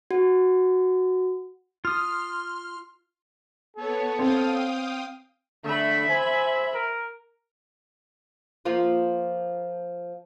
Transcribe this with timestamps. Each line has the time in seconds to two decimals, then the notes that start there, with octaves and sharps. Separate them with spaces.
0.11 F#4
1.85 F4 C6 D#6 F6
3.77 B3 A4 C#5
4.19 C4 F5 G5 D#6
5.65 D3 A3 E5 B5
6.09 C5 G#5
6.74 A#4
8.65 F3 A#3 F4